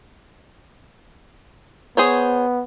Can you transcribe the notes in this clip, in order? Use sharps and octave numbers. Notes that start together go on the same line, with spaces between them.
B3 G#4 C5 C#5